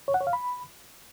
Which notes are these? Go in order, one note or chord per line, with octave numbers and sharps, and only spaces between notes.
C#5
F#5
C#5
F5
B5